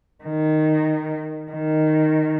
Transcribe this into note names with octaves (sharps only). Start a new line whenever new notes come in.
D#3
D#3